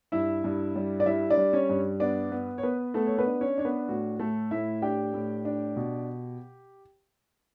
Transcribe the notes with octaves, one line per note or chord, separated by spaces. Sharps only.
G2 E4 E5
G2
G3
D5
G3 E4 E5
D4 D5
G3
C#4 C#5
G2
B3 D4 D5
B3
C#5
B3 B4
A3 B3 A4
C#5
B3 B4
D4
C#4 C#5
D4 C#5
B3 B4
A2 F#4
A2 A3 A4
A2 E4 E5
D4 G4 G5
A2
D4
B2